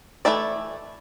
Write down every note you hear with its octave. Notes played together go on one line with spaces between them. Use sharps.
E3 A3 E4 A4 D5